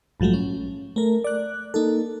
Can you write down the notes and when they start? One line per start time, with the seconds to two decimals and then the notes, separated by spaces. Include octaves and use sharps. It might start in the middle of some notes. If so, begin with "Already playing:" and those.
0.20 A#1 G#2 F3 F#3 A3
0.34 C#4
0.96 A3 A#4
1.24 D5 F#6
1.74 A#3 D#4 A4